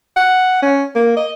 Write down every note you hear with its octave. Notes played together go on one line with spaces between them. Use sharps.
F#5
C#4
A#3
D#5